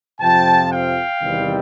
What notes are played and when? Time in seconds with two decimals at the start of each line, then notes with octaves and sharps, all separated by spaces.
0.20 F2 C3 F3 G5 A5
0.71 F5 G5
1.22 E2 C3 D#3 G3 C4